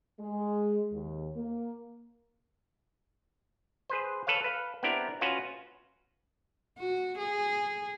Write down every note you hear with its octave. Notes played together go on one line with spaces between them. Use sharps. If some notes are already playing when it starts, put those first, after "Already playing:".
G#3
D#2
A#3
G#4 B4 C5
A4 B4 C#5 F5
B4 F5
B3 C4 D4 E4 G4 A#4
C#4 F4 F#4 B4 F5
F#4
G#4